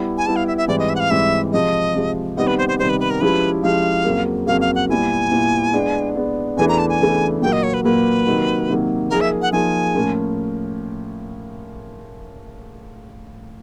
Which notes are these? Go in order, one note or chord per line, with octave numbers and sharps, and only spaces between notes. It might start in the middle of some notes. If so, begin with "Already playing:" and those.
Already playing: G3 B3 E4
G#5
G3 B3 E4 A5
F5
E5
E5
G#2 E3 G3 C4 D5
D#5
E5
F#5
F5
G#2 E3 G3 C4 E5
C3 F3 G#3 D#5
C3 F3 G#3
C3 D#3 G3 B3 D#5
B4
C5
C5
C3 D#3 G3 B3 C5
B4
B4
A#4
F3 G#3 C#4 E4 G4 B4
F3 G#3 C#4 E4 G4 F5
F2 C#3 F#3 A#3
F2 C#3 F#3 A#3 F5
F5
F#5
A#2 G3 B3 E4 G#5
A#2 G3 B3 E4
G#3 B3 D4
G#3 B3 D4
E2 C#3 E3 A3 D4 G#5
A#5
A5
G#5
E2 C#3 E3 A3 D4
A#2 F#3 A#3 G5
D#5
C#5
B4
A#2 F#3 A#3 B4
C3 D#3 F#3 A#3
C3 D#3 F#3 A#3
F3 A#3 D#4 G#4 A#4
E5
F#5
F3 A#3 D#4 G#4 G#5
A2 F3 A#3 C#4